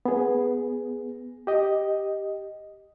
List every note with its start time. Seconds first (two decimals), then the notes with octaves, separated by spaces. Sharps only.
0.06 B3 G#4
1.47 G4 D#5